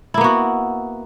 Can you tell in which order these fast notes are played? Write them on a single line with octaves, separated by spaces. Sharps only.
E4 A#3 B3 F#4